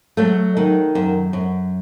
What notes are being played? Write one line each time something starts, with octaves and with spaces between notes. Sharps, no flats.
F#3 A3
D#3
F#2
F#2